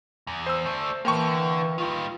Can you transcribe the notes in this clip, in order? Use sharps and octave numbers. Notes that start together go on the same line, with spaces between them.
E2
C5 E6
A3 D4
E3 F3 A#3 B3 G5 C#6
D3
D#3 G3 F4